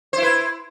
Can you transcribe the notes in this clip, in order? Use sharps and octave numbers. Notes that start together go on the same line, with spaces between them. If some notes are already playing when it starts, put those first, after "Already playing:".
E4 B4 C5